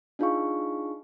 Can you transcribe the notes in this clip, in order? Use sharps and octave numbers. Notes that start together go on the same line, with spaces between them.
D4 D#4 F4 G#4 F5 C#6